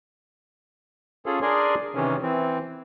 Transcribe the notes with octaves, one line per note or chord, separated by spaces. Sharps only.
C#4 F4 G#4 A4
D4 G#4 A#4 D5 G#5 C6
C3 D#3 E3 C#4
E3 C4